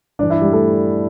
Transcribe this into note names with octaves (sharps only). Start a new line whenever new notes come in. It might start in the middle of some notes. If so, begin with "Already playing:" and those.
G2 E3 D4 D5
E4 E5
G3 G4
A3 A4